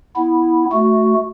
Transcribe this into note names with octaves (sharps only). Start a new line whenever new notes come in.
B3 E4
A3 F#4